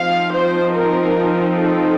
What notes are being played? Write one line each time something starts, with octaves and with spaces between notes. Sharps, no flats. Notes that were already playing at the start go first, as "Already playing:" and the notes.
Already playing: F3 C4 D#4 F5
C5
A#4
A4